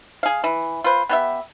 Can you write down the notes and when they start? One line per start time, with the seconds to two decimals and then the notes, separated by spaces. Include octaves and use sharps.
0.23 G#4 F5
0.44 E3
0.84 F4 B4 C5
1.09 B3 G4 E5